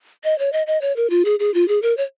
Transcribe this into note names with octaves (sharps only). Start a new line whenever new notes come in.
D#5
C#5
D#5
D#5
C#5
A#4
F4
G#4
G#4
F4
G#4
A#4
C#5